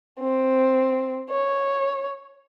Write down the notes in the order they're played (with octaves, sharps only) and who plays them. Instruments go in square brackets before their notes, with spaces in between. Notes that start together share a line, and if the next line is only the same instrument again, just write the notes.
[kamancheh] C4
C#5